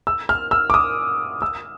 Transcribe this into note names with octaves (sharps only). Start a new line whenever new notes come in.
E6
F6
E6
D6
D#6
E6